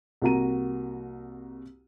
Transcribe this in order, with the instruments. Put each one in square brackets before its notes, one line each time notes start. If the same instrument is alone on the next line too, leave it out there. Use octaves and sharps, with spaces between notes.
[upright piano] C2 A#3 F#4 A#5 D#7